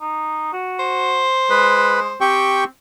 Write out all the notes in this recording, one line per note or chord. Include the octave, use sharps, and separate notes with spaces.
D#4
F#4
C5
G#3 B4
C4 G4 G5 C#6